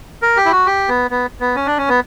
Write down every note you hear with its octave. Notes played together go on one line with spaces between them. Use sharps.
A#4
G4
E4
F#4
G4
B3
B3
B3
C#4
D4
C#4
B3